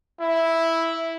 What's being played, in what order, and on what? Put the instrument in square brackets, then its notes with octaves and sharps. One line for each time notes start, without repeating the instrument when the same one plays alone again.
[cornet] E4